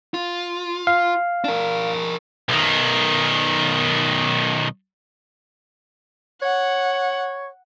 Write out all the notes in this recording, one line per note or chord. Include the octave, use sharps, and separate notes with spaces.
F4
F5
D4 A#4
B1 D#3
C#5 F#5